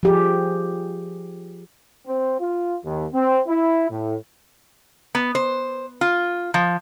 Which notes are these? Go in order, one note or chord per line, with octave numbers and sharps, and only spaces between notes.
F3 G4 G#4
C4
F4
D#2
C4
E4
A2
B3
C5
F4
F3